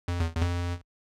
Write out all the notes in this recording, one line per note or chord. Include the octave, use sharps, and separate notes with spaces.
F2
E2
E2
F2